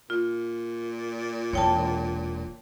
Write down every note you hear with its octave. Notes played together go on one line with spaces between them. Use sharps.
A#2 F4
E1 E4 C#5 G5 A5